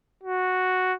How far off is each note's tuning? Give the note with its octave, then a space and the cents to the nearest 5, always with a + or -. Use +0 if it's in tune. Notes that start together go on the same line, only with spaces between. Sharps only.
F#4 -5